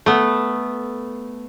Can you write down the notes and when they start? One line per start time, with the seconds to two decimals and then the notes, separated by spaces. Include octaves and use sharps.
0.06 A3 B3